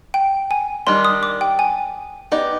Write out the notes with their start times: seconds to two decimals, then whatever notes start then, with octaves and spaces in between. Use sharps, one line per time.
0.14 G5
0.51 G#5
0.87 D#3 G3 D4 C6
1.05 D#6
1.23 D6
1.41 G5
1.59 G#5
2.32 B3 D#4 G4 D5